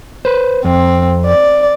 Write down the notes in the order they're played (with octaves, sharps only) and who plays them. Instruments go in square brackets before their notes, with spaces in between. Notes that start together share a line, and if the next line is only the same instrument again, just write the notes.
[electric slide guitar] B4 C5
[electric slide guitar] F2 [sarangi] C4
[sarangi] D5